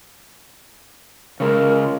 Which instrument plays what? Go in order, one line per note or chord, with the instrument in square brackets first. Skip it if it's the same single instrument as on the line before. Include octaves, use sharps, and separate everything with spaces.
[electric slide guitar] C#3 G#3 [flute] A#4